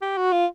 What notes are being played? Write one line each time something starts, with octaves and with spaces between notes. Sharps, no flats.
G4
F#4
F4